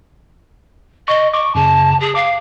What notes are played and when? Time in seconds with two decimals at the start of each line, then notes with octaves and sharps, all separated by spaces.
1.08 D#5 C#6
1.34 C#6 D6
1.55 F#2 C#3 A5
2.00 G#4
2.15 F5 D6